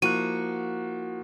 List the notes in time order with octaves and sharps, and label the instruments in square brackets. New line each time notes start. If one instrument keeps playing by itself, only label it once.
[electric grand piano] F3 A#3 [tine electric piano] E4 F#6 [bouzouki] F#4 [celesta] D#7